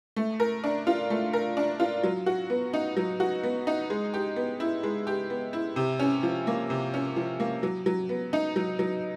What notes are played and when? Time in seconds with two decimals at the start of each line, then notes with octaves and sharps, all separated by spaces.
0.16 A3
0.40 A#4
0.64 D4
0.87 F4
1.10 A3
1.33 A#4
1.57 D4
1.80 F4
2.03 F#3
2.26 F#4
2.50 B3
2.73 D#4
2.97 F#3
3.20 F#4
3.43 B3
3.67 D#4
3.90 G#3
4.14 G4
4.36 B3
4.60 E4
4.83 G#3
5.07 G4
5.30 B3
5.53 E4
5.76 C3
6.00 C#4
6.23 F3
6.47 A#3
6.70 C3
6.94 C#4
7.16 F3
7.40 A#3
7.63 F#3
7.86 F#3
8.09 B3
8.33 D#4
8.56 F#3
8.79 F#3